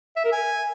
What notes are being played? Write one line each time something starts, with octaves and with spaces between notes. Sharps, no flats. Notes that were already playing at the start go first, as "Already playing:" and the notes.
E5
A#4
G#5